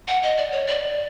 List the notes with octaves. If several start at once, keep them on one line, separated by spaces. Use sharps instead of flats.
F#5
D#5
D5
C#5
D5